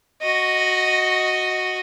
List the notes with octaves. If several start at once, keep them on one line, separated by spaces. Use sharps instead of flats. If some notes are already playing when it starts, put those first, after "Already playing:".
F#4 D#5